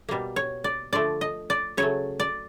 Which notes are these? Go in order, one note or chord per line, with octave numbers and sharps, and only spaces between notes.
B2 G3 A#3
C#5
D5
D3 F3 A3 D5
D#5
D5
C#3 F#3 A3 C#5
D5